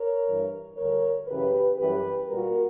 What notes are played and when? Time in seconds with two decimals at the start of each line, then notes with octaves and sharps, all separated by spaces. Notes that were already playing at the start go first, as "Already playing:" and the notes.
Already playing: A#4 C#5
0.27 G2 E3 G3
0.78 D2 D3 G3 A#4 C#5
1.28 F#2 C#3 E3 G4 B4
1.78 F#2 E3 G3 G4 B4
2.29 A#2 G3 F#4 A#4